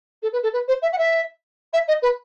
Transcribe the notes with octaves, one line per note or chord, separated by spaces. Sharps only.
A4
B4
A4
B4
C5
E5
F#5
E5
E5
D#5
B4